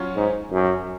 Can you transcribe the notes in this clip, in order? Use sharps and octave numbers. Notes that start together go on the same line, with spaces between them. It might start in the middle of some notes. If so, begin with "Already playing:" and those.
Already playing: F#3 C#4 F4
G#2
F#2